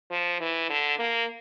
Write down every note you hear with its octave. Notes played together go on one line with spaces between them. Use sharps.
F3
E3
D3
A#3